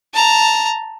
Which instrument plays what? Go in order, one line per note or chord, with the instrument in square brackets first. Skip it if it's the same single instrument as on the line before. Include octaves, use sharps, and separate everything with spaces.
[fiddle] A5 A#5